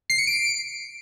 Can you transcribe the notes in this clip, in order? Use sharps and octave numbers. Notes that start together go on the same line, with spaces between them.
C7
C#7
D7